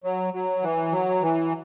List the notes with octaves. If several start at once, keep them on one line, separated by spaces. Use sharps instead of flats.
F#3
F#3
E3
F#3
E3